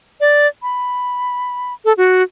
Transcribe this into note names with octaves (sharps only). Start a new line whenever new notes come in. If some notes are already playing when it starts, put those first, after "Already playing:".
D5
B5
A4
F#4